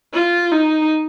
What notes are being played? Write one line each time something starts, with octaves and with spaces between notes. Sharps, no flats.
F4
D#4